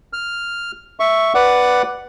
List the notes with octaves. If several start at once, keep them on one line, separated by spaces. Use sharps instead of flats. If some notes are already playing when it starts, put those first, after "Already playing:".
F6
E5 C#6
B4 D5 F#5 D6